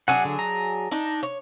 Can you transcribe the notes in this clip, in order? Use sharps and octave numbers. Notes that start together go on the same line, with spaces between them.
F#3 D4 G#4 F#5 G#5
D3
A#5
D4 D#4
C#5